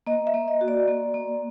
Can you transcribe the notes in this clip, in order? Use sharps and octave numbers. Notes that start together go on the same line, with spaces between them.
A#3 D#5
E5
A#3
D#5
F#4
D5
A#3
A#3